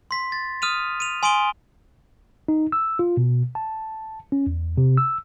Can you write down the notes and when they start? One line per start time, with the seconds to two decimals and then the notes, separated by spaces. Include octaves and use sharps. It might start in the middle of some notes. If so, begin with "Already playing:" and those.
0.11 C6 B6
0.32 A6
0.62 D#6 F6 D#7 F7
1.00 D#7 F7
1.23 G#5 C6 D#6 D7 D#7 G7
2.48 D#4
2.72 E6
2.99 F4
3.17 B2
3.55 A5
4.32 C#4
4.47 E2
4.78 C3
4.98 E6